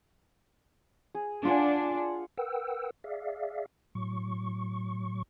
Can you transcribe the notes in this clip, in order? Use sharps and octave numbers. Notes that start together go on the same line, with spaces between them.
G#4
D4 F4 F#5 G#5
A#4 B4 F#5 G5 E6
G#4 D5 E5 F5
A2 F#3 C#6